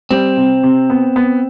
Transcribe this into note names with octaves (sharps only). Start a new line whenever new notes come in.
G3 C4
C3
C3
B3
B3